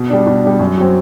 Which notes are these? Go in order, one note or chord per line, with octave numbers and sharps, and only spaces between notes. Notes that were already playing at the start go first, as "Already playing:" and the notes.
Already playing: B2
G3 D4
B2
G3 D4
F#2
F#3 C4